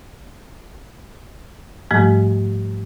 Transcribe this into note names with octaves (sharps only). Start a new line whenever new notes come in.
G#2 F3 G3 A3